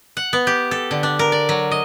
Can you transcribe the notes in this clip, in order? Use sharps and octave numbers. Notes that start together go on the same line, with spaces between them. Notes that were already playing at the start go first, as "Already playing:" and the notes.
F#5
B3
G4
A4
D3
D4
A#4
D5
F#3
D#5